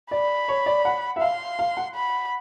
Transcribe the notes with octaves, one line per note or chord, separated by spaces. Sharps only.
D5 B5
C#5
D5
F#5
E5
F5 C6
F5
F#5
B5